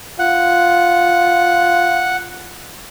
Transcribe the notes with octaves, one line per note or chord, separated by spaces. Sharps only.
F4 F#5